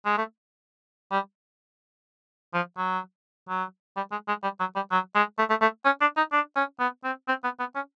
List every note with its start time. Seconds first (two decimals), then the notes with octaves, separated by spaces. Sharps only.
0.06 G#3
0.18 A3
1.12 G3
2.54 F3
2.77 F#3
3.49 F#3
3.97 G3
4.12 G#3
4.28 G#3
4.43 G3
4.60 F#3
4.76 G3
4.92 F#3
5.15 G#3
5.39 A3
5.50 A3
5.62 A3
5.85 C#4
6.02 D4
6.17 D#4
6.33 D4
6.56 C#4
6.80 B3
7.04 C4
7.28 C4
7.44 B3
7.59 B3
7.75 C#4